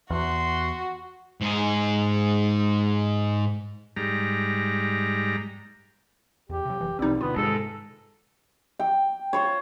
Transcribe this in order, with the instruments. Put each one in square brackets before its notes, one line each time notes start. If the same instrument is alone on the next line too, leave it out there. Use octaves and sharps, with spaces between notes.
[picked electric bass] E2 [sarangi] F#4 [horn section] F#5 C6
[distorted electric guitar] G#2 G#4
[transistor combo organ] G#2 G3 A#5
[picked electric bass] E2 [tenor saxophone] G4
[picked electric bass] C3 F#3
[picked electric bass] F#1 [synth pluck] E3
[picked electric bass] A#1 B2 E3 [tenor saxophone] G3 [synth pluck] C4 D#4
[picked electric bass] D2 B2 D3 [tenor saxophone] B3 [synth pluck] F4
[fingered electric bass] G#2 [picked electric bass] C3 D#3 [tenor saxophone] A4
[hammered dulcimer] G5
F4 C5 C#5